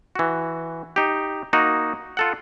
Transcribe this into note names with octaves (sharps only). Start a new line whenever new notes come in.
E3 F#4
D#4 G4
A#3 D#4 F#4
F4 A4 F#5